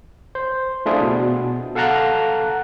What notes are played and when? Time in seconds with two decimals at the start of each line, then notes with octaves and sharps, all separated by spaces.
0.35 C5
0.86 A3 D4 E4 F4 G#4
1.01 B2
1.75 A4 F5 F#5 A5 A#5 F#6